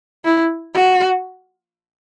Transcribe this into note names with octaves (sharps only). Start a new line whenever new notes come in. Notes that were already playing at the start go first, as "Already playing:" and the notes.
E4
F#4